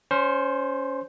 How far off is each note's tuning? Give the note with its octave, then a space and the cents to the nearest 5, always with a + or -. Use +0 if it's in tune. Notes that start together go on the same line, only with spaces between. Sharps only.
C#4 +15 C5 -5 C6 +45